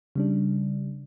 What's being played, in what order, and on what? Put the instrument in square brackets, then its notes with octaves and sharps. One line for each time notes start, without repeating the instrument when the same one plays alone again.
[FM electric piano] C#3 G3 D4